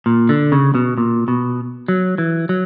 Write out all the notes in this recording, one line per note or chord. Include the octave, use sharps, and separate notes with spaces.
A#2
D3
C#3
B2
A#2
B2
F#3
E3
F#3